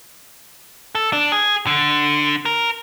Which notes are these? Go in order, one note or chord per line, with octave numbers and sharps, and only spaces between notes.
A4
D4
G#4
D3
A#4